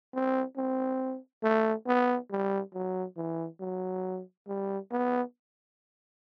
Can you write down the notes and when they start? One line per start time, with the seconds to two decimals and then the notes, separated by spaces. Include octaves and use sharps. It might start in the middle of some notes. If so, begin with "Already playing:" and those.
0.14 C4
0.57 C4
1.43 A3
1.87 B3
2.31 G3
2.74 F#3
3.17 E3
3.60 F#3
4.48 G3
4.91 B3